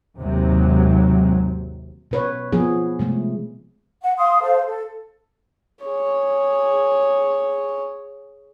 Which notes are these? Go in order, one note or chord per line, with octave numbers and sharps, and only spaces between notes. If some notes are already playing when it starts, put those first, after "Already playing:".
G#1 D#2 C3 F#3 G#3
B2 B4 C#5
F3 B3 G#4
C3 G#3 A3
F#5
F5 C6 D#6
A4 C5 F5
A4
G#4 C#5